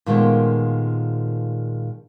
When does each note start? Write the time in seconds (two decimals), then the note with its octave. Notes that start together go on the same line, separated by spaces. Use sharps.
0.06 A#2 D#3 F3 G#3 A3 B3